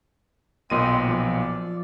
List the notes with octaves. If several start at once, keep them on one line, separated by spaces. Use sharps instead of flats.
B1 A#2 C4 D#5 D#7
F3 D5